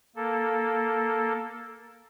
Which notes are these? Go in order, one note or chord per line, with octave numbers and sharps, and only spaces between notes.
A#3 A4